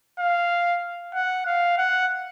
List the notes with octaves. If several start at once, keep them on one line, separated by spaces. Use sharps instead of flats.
F5
F#5
F5
F#5